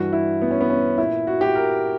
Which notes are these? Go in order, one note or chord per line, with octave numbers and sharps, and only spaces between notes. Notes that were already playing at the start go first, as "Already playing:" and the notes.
Already playing: G2 E3 F#4
E4
B3
C#4
B3
C#4
A#2 E4
F#4
G4
A#4